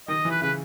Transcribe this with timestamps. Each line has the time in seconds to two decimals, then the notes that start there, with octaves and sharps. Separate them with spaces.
0.08 D#3 D#5
0.25 E3
0.31 B4
0.42 C#3 B4